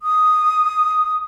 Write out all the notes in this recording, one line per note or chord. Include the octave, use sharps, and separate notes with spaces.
D#6